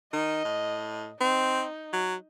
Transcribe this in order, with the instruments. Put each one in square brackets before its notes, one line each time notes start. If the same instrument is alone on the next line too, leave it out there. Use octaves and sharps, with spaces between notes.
[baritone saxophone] D#3 [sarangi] D#5
[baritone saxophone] A2
[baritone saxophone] C4 [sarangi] D#4
[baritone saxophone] F#3